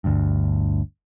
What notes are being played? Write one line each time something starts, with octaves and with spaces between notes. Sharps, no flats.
G1 D2 G2